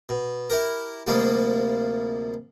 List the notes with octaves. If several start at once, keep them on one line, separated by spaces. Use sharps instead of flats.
B2
E4 G4 A#4
D2 C3 F3 G3 G#3 A#3